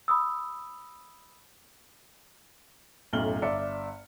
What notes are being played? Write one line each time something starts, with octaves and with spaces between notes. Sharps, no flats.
B5 D#6 E6
B1 F#2 A2 F6 F#7 G7
G1 D5 E5 C#7